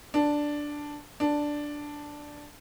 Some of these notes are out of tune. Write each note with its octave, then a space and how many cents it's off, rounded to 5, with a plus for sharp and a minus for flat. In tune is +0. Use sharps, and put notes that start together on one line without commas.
D4 +0
D4 +0